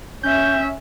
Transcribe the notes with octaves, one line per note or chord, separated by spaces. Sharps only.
C#4 E5 G6